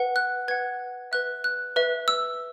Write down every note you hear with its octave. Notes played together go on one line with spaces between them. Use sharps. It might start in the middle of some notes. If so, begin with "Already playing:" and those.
Already playing: B4 F#5
F#6
B4 F#5 G#6
B4 E5 F#6
F#6
B4 E5
E6